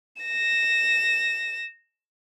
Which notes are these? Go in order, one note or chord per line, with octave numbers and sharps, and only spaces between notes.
A#6 E7